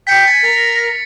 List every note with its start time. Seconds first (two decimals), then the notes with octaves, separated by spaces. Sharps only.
0.07 G5 B6 C#7
0.26 G#5 A6 C#7
0.42 A#4